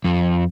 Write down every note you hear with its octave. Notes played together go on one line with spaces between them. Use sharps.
F2